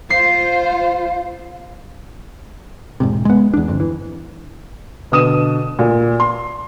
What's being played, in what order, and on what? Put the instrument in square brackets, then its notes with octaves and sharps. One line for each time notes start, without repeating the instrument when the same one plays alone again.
[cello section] F4 C5 [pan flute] F5 [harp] C7
[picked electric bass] E1 G#2 C3
G#3 B3
E2 D4
G1 F2
E3
[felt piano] B2 D3 D#6 D#7 E7
A#2
C6